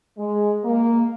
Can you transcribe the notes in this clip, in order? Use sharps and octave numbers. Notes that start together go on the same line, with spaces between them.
G#3
A#3